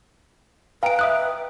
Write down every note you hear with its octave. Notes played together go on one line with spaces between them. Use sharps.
B4 D#5 F5 G5 A#5 D7
E5 D#6 F#6